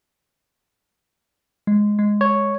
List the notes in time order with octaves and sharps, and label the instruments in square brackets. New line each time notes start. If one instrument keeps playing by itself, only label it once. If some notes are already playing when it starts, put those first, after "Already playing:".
[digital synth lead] G#3
G#3
[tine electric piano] C#5